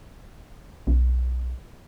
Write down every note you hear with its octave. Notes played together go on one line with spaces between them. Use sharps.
B1